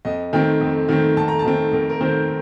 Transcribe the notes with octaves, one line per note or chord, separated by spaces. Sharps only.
F2 D#5
D#3 A3 C4 G5
F2
D#3 A3 C4
F2 A5
A#5
A5
D#3 A3 C4
F2 A#4
A#4
D#3 A3 C4 C5